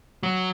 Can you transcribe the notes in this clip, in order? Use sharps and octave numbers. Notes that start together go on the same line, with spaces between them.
F#3